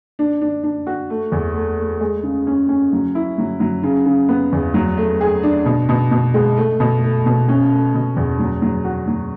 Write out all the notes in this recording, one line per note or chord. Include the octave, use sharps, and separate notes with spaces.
D4
D4
D4
F#4
A3
E2
A3
A3
G#3
C#3
C#4
C#4
F#3
E4
F#3
F#3
C#3
C#3
B3
E2
F#3
A3
G#4
D4
B2
B2
B2
G#3
A3
B2
A3
B2
C#4
A3
B2
E2
F#3
F#3
F#4
F#3